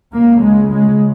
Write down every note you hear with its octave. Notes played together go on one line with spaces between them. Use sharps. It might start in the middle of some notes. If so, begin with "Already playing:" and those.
C#2 C#3 A#3
G#3
G#3